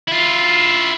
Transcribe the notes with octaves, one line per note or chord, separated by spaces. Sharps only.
E4 F4